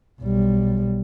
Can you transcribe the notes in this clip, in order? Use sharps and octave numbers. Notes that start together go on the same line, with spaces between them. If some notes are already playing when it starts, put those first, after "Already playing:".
B1 G3